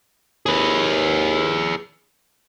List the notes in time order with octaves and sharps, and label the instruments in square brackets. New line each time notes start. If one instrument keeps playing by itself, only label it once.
[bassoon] D#2 [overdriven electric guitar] G#4 B4